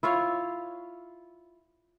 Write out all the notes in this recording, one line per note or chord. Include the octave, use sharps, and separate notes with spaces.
E4 F4 C#5 F5